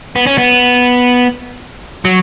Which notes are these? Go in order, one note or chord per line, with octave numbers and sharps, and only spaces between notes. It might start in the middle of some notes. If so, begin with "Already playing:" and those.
B3
C#4
B3
F#3